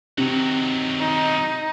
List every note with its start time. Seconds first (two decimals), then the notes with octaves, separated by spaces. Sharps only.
0.18 C3 D#3 F#3
1.01 D#4